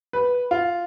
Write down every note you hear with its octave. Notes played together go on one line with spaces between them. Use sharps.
B4
F4